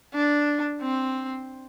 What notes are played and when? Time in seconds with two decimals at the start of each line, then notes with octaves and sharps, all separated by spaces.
0.14 D4
0.81 C4